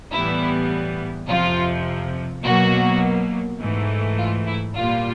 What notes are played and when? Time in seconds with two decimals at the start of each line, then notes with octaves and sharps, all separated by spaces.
0.12 A2 E3 G3 B3 E4
1.28 F2 C3 F3 F4
2.44 B2 F#3 A#3 F#4
3.60 G#2 E3 A3
4.18 F4
4.47 E4
4.75 A#2 G3 A#3 F4